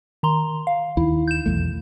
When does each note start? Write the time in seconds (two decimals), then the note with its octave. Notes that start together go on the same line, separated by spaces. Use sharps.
0.23 D#3 A#5 C6
0.67 F5
0.97 D#2 D#3 E4
1.28 G6 E7
1.46 B1 E2 A3